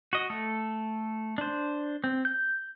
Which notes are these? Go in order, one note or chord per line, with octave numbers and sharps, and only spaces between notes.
F#4 D#5
A3 A4
D4 C5
C4
G6